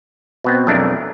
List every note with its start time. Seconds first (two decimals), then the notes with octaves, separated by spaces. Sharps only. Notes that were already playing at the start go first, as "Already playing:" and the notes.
0.44 B2 B3 C4
0.67 B1 F2 G#3 A3 D4 A#4